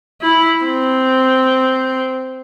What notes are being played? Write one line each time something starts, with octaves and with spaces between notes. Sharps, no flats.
E4
C4